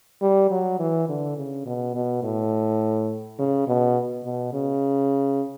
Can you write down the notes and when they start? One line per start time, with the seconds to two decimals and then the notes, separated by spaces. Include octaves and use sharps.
0.22 G3
0.51 F#3
0.79 E3
1.09 D3
1.37 C#3
1.66 B2
1.95 B2
2.23 A2
3.39 C#3
3.67 B2
4.24 B2
4.53 C#3